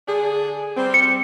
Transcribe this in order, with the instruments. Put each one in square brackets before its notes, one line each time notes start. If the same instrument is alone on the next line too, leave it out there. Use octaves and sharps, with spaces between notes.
[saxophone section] D3 D4 G#4
G3 C4
[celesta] C#7